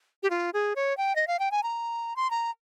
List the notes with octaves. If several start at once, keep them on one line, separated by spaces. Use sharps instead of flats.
G4
F4
G#4
C#5
G5
D#5
F5
G5
G#5
A#5
C6
A#5